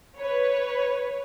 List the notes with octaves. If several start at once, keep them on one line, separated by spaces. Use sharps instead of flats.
B4 C#5